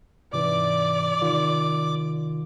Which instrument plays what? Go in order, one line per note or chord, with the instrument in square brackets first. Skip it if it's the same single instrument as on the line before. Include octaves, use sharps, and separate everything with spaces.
[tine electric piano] G#2 C3 E3 [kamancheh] D5 [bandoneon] D6
[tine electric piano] C3 D#3 F4